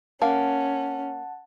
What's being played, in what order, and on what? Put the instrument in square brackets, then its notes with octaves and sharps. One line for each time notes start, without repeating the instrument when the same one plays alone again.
[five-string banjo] A#3 F5 [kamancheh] C#4 [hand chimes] F#5 A5